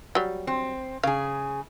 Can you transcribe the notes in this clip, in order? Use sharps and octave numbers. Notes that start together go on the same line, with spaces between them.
F#3 G3
C4
C#3 G#4 F5